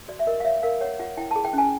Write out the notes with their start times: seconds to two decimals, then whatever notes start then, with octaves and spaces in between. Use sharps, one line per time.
0.08 F#4 D5
0.19 E5
0.27 A#4 D#5
0.40 F5
0.45 C#5 E5
0.63 A#4 F5
0.81 C#5 F#5
0.99 F4 F#5
1.17 E4 G5
1.31 A5
1.36 G#4
1.45 G5
1.53 C#4 G#5